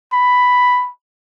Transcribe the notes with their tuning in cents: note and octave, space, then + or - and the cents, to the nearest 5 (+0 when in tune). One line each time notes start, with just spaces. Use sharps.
B5 +5